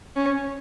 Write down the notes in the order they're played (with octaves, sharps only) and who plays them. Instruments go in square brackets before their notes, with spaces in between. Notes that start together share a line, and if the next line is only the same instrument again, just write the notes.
[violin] C#4